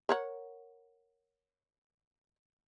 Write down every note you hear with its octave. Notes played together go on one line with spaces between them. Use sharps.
A#4 C#5 F#5